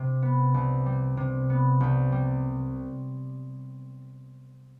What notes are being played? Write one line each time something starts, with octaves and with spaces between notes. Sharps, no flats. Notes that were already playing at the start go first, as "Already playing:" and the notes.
Already playing: C3
B3
C2
G3
C3
B3
C2
G3